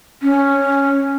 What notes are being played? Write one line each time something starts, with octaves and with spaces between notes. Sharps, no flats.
C#4